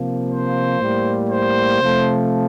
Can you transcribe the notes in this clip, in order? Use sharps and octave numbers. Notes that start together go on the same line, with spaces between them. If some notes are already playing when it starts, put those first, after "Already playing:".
Already playing: C3 F3 A#3
C5
A2 G3 A#3
C5
C3 F3 A3